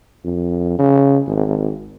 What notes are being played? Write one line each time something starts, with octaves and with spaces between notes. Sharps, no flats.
F2
C#3
G#1